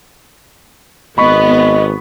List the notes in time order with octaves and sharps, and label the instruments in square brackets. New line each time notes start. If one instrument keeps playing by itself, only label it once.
[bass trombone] G#1 [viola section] B3 [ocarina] D#5 [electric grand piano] B5 C#6 B6